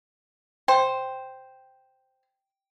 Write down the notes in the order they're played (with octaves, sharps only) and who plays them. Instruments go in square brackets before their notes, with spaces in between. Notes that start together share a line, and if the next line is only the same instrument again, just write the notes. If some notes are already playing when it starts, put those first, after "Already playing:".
[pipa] C5 [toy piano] G5